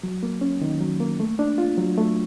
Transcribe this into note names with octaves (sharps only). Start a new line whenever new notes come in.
F#3
A#3
C#4
D#3
F#3
A#3
A3
D4
F4
F#3
A3